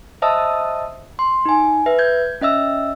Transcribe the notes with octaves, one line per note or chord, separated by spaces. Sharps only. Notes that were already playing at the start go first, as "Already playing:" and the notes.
C5 D#5 E5 A5 D#6 E6
C6
D#4 G#5
B4 E5
G6 G#6
C#4 D#5 E5 E6